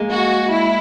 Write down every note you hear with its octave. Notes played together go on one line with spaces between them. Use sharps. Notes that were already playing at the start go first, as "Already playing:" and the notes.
Already playing: G#3 A#3
F#4
E4